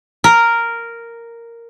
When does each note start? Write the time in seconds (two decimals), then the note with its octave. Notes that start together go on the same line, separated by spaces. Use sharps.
0.24 A#4